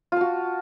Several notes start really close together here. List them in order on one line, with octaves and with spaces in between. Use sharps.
F4 A5 F#4